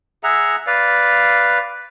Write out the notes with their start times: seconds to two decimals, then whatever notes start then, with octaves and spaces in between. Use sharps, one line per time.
0.24 G#4 E5 F#5 A#5
0.67 B4 D5 F5